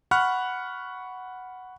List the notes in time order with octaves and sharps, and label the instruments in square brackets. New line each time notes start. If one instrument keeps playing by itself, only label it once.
[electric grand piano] F#5 B5 C#6 F6 F#6